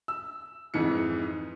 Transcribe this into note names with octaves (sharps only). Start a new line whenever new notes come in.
E6
F2 G#2 E3 C#7